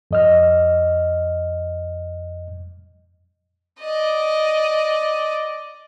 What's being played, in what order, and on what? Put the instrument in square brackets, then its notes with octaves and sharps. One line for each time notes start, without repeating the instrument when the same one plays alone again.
[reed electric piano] F2 D#5 F6
[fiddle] D5 D#5